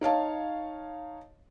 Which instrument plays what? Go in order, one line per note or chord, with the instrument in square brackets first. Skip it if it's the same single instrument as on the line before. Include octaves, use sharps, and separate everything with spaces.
[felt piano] D#4 C#5 F5 A5